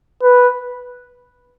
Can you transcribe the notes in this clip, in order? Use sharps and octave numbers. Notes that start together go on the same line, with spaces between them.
B4